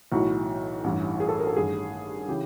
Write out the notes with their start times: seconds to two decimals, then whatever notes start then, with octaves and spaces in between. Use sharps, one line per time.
0.11 B1 A2 E3 F#4
0.84 A1 G2 E3
1.20 G#4
1.29 A4
1.39 A#4
1.47 A4
1.55 A1 G2 D#3 G#4
2.28 C#3 E3 G4